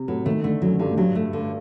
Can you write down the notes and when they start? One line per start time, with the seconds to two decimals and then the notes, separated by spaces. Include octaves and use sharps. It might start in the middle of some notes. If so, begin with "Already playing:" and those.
Already playing: C3
0.08 A2 F#3
0.26 D#3 A3
0.44 D3 A3
0.62 F#2 F#3
0.79 G2 D3
0.91 A2
0.97 G2 F#3
1.15 A3
1.33 D3